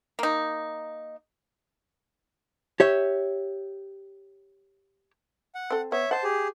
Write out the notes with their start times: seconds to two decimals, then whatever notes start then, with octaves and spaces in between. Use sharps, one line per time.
0.19 A#3 D#4
2.80 G4 C#5 E5
5.55 F#5
5.70 C4 A4
5.92 B3 C#5 E5
6.11 C5 D#5 F#5 A5
6.24 G4 G#4